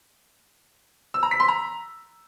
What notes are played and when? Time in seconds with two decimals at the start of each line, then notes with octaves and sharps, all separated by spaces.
1.14 E6
1.23 A#5
1.31 B6
1.40 C6
1.48 A#5